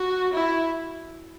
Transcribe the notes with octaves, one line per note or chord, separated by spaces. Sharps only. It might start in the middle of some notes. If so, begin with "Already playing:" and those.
Already playing: F#4
E4